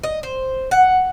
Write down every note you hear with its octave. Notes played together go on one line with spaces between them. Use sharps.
D#5
C5
F#5